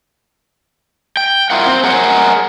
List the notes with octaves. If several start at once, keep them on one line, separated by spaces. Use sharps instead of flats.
G5
E4 F4 A#4 F#5
C4
G#4 A#4 F#5